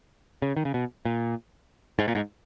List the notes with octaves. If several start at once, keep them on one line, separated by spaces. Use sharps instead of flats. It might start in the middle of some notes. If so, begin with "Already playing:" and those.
C#3
D#3
C#3
B2
A#2
G#2
A#2
G#2